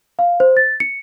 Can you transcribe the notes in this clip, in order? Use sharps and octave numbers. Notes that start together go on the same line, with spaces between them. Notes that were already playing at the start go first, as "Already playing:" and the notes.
F5
C5
A6
C#7